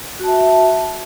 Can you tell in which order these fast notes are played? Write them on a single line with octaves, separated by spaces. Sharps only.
F#4 A5 E5